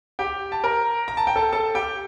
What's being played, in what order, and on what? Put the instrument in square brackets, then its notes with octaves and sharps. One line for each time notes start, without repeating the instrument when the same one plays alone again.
[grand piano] G4 G5
A5
A#4 A#5
A#5
A5
G5
A4 A5
A4 A5
G4 G5